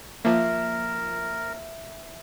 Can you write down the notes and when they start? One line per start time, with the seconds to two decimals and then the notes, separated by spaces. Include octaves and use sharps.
0.25 F3 A#3 A#4 E5